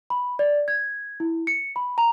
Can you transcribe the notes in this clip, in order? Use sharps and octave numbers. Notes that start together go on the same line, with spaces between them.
B5
D5
G#6
E4
C#7
B5
A#5